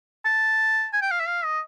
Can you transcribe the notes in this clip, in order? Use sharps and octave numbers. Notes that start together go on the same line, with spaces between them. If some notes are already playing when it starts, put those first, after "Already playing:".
A5
G#5
G5
F5
E5
F5
D#5